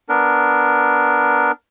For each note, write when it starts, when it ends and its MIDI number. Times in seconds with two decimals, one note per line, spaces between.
0.09 1.51 59
0.09 1.51 62
0.09 1.51 70